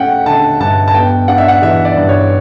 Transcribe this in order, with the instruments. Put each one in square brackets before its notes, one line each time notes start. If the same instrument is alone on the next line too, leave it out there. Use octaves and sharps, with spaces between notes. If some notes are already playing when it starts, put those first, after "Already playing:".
Already playing: [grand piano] A3 C#4 F#5 G5
D3 A5
G2 A5
A5
B3 G5
D4 F#5
E5
F#5
E3 E5
D5
G2
C#5